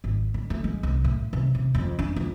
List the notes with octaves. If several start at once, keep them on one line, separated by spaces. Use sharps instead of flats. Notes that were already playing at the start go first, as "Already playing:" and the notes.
G#1
D3
A3
G#3
C2
A2
C3
C3
F2
D4
F2